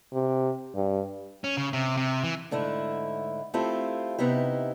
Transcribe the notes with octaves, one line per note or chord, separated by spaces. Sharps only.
C3
G2
C#4
C#3
C3
C3
E3
G#2 D3 A3 E4
A3 C4 E4 F4 G4 A4
C3 B3 D#4 E4 G4